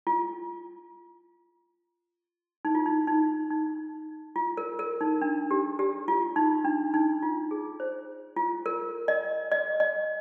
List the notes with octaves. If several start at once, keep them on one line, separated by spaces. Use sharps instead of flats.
F4
D#4
F4
D#4
D#4
D#4
F4
A#4
A#4
D#4
D4
G4
G4
F4
D#4
D4
D#4
F4
G#4
C5
F4
A#4
D#5
D#5
D#5